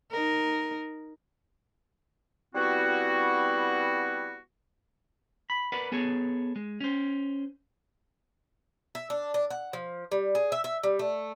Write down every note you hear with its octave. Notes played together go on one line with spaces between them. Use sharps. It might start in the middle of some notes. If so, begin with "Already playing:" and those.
D#4 A#4
G3 B3 C4 E4 F#4
B5
A#4 B4 D5 F#5 B5
B3 G#4 A4 C#5
G#3
C#4 C5
E5
D4
D4
F#5
F3
G3
G#4
E5
E5
G3
A3